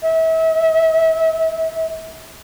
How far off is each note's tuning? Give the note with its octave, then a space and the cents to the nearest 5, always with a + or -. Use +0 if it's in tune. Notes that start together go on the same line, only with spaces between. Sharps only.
E5 -35